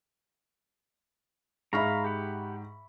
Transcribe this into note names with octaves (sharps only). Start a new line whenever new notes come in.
G#2 E5 F5 A#5 B5 C#6
G4 F#5